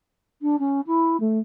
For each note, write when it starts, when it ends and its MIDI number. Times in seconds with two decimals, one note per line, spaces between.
0.42 0.56 62
0.59 0.81 61
0.86 1.16 64
1.20 1.39 57